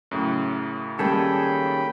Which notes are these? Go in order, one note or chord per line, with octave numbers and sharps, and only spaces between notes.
F#2 A2 C#3
D#3 G3 A#3 C#4 G#4 A4 G5 B5